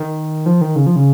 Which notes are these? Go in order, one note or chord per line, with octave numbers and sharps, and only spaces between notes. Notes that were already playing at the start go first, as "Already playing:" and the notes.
Already playing: D#3
F3
D#3
C#3
F3
C#3